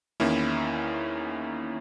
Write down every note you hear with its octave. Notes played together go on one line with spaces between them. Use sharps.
E2 D#3 A#3 C#4 E4